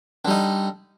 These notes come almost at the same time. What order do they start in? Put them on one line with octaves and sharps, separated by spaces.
D3 G3 D#4